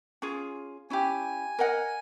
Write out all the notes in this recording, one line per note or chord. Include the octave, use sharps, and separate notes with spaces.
C#4 F4 G#4
C#4 E4 G4 G#5
A#4 D#5 F#5